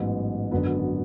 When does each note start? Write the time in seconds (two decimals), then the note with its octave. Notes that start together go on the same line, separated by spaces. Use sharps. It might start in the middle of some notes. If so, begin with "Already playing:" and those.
Already playing: A1 G#2 F#3 B3
0.51 G#1 F#2 D3 F#3 B3